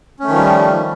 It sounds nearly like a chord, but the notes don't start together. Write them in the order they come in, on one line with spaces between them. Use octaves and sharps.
C#4 A3 D#3 F3 G3